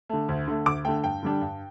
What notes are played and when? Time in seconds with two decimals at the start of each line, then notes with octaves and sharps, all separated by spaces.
0.09 D3 A3
0.28 D2
0.47 D3 A3
0.66 D2 D6
0.85 D3 A3 G5
1.04 G2 G5
1.23 D3 G3 D4
1.41 G2